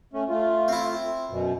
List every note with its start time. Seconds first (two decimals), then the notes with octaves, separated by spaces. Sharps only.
0.13 A3 C#4
0.29 A3 F4
0.68 C4 E4
1.30 F#2 B2